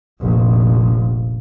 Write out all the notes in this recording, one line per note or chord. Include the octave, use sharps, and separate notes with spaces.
F1 A#1